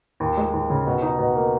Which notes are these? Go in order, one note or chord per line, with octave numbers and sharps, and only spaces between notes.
D#2
G#3
D#2
C#3
B2
D#4
B2
A#3